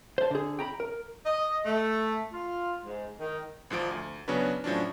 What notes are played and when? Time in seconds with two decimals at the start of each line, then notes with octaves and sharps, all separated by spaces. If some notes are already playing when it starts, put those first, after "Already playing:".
0.18 C5 A5
0.31 D3 G#4
0.59 G5 A#5 B5
0.80 A#4
1.26 D#5
1.66 A3
2.32 F4
2.85 G#2
3.20 D#3
3.70 G#1 G#2 F3 D7
3.91 D2
4.28 C#3 F#3 B3 C#4 D4 B4
4.64 A2 F3 F#3 C#4 D4